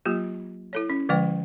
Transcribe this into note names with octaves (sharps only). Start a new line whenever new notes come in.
F#3 A#3 F4 G4
E4 A4 C#5
C#4
D3 F3 G#3 B4 G5